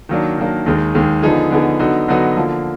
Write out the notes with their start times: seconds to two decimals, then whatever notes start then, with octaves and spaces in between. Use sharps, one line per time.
0.09 D#3 F#3 A#3 D4
0.38 D#3 F#3 A#3 D4
0.66 D#2 D#3 G#3
0.95 D#2 D#3 G#3
1.22 D3 F3 B3 D#4 G#4
1.51 D3 F3 B3 D#4 G#4
1.79 D3 F#3 B3 D#4 F#4
2.08 D3 F#3 B3 D#4 F#4
2.37 D3 F3 A#3